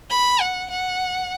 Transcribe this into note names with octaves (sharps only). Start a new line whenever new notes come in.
B5
F#5
F#5